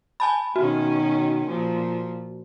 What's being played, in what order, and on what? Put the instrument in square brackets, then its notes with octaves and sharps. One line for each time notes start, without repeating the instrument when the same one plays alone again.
[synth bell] G#5 A5 B5
[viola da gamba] B2 D#3 C#4 [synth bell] F#4
[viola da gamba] A#2 F3